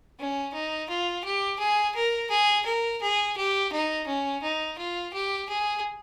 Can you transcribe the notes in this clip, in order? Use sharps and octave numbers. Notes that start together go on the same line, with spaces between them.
C#4
D#4
F4
G4
G#4
A#4
G#4
A#4
G#4
G4
D#4
C#4
D#4
F4
G4
G#4